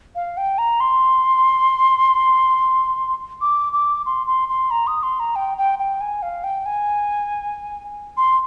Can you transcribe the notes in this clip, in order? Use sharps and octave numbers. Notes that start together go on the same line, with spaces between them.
F5
G5
A#5
C6
D6
D6
C6
C6
C6
A#5
D#6
C6
A#5
G5
G5
G5
G#5
F5
G5
G#5
C6